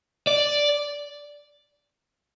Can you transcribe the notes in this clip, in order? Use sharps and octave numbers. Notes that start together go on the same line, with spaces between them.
D5